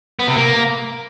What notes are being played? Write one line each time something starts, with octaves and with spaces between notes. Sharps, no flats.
B3
C3
A#3